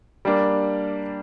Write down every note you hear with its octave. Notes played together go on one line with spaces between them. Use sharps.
G3 A#3 D4